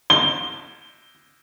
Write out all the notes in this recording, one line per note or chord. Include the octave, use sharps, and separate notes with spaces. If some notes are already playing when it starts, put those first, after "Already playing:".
G7